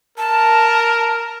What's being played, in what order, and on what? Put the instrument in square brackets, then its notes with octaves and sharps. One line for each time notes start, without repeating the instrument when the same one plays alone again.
[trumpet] A#4 [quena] A5